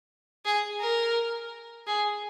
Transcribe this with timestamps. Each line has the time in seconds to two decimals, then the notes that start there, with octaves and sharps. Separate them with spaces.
0.45 G#4
0.80 A#4
1.87 G#4